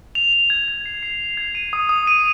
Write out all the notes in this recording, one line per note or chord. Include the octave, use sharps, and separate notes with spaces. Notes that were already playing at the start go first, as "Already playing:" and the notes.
F7
F7
G#6
G#6
C7
C7
C7
G#6
D#7
D#6
D#6
D#7